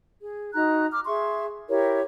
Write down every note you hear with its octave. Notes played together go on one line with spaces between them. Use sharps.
G#4
D#4 F#4 A#5 F#6
D6 F6
G#4 E5 C6 C#6
E4 G4 A#4 C#5